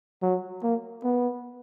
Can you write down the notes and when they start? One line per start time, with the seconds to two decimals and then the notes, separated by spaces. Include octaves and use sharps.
0.22 F#3
0.63 A#3
1.04 B3